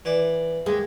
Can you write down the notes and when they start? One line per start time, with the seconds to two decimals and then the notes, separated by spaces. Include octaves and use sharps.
0.05 E3 D5
0.66 D#2 G#3